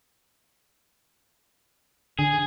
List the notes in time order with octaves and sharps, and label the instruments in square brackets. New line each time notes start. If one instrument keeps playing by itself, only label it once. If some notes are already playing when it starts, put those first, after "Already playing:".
[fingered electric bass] D3 [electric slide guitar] G#4